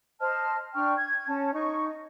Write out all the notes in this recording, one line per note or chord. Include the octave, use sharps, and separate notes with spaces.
C5 D#5 A5 F6
D4 G5 C#6 F6
G#6
C#4 A5
D#4 C#6
D#5